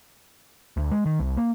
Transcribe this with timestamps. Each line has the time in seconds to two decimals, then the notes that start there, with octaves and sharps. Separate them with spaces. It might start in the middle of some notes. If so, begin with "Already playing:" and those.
0.77 D2
0.92 G#3
1.06 D#3
1.20 C2
1.37 A#3